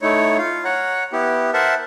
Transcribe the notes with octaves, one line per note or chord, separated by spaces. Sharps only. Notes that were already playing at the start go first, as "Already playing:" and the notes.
A3 D#4 E4 C#5
F4 F5
C#5 F#5 A#5
B3 E4 G4
A#4 C5 E5 F#5 A5